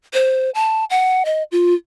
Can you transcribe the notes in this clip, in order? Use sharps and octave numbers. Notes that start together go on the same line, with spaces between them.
C5
A5
F#5
D#5
F4